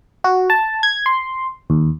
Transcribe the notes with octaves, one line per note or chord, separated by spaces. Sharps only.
F#4
A5
G#6
C6
D#2